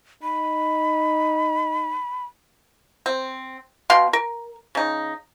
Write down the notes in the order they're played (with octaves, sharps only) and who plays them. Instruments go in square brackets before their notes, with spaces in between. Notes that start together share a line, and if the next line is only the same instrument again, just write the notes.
[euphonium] D#4 [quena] B5
[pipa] C4
B2 F5 G5 C6
A#4
C#3 D#4